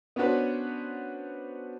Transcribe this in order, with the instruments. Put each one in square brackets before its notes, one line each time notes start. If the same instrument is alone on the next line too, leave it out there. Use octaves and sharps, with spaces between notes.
[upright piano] B3 C#4 D4 F#4 B4 C5